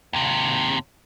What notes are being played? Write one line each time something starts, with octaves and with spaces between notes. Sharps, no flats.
D#2 C3